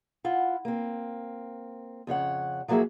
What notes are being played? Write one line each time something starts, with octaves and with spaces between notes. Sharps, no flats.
E4 F4 F#5
A#3 C4
F2 C#3 C#5 F#5
F3 F#3 A#3 E4 G#4 E5